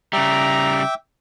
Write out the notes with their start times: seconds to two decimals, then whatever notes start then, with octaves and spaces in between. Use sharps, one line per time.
0.13 C#3 G3 E5 G5 A#5 D6